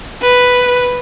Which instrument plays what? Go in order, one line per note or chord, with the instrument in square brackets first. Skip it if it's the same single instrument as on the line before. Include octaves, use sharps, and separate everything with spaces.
[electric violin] B4